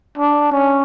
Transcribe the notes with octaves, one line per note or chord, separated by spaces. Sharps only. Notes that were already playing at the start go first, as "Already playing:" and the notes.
D4
C#4